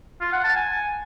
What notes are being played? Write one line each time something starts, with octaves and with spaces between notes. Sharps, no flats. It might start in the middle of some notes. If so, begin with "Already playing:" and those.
F4
F#5
A5
G#5